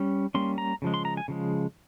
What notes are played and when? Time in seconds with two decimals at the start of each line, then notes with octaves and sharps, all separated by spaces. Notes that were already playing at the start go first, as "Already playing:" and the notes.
Already playing: G3 C#4
0.35 G3 A#3 C#4 C6
0.58 A#5
0.82 C#3 F3 G#3
0.94 C6
1.05 A#5
1.17 G#5
1.28 C#3 F3 G#3